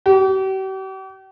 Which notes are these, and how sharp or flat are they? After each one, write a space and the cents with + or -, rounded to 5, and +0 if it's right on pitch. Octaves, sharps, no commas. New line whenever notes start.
G4 -45